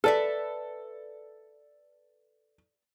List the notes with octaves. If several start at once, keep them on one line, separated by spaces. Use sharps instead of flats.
A4 B4 D5 E5